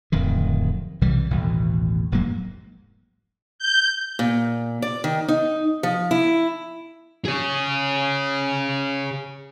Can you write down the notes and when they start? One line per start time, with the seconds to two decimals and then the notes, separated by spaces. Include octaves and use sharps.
0.12 D1 F2 D#3
1.01 B1 C3 E3 G3
1.30 A1 D#2 B2
2.12 E1 G#2 F#3 A#3
3.59 G6
4.19 A#2
4.82 D5
5.04 D#3
5.28 D#4
5.83 F3
6.11 E4
7.25 G#4 C#5